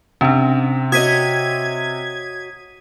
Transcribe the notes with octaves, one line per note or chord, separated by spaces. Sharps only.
C3 C#4 D4
F#4 C#5 D#5 D#6 G#6 B6 D#7